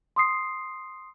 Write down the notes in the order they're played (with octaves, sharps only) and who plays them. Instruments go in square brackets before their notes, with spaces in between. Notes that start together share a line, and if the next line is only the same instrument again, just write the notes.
[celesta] C6 D#6 C7